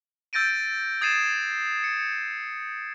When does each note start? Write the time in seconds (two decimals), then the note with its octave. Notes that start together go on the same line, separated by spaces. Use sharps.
0.33 E6 G6 A6 A#6 D7 D#7
1.01 D#6 G#6 A6 C7 D#7 E7
1.84 C#7